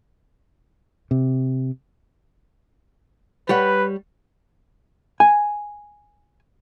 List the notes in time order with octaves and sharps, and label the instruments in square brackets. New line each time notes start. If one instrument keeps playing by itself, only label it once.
[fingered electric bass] C3
[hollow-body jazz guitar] G3 C#5 F#5 [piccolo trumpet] B4
[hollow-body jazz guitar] G#5